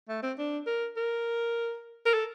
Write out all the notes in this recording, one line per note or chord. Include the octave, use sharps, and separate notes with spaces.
A3
C4
D4
A#4
A#4
A#4
A4